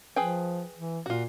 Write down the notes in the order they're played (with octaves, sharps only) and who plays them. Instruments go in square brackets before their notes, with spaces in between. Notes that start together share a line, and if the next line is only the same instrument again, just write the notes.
[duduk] F3 [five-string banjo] G#4 B4 G5
[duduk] E3
[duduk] A#2 [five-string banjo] F4 F#4